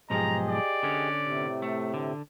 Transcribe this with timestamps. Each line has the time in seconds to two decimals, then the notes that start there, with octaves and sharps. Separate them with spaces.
0.10 B1 G#2 F3 G4 G#4 D#5 A#5
0.49 D5
0.83 D3 C#4
1.20 A2 C3
1.62 A3
1.94 D3